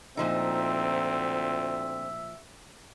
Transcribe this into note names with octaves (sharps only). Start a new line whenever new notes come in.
D2 A#2 F3 C4 D#4 E5